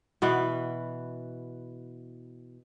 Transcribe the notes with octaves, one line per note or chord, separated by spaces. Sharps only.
B2 E3 B3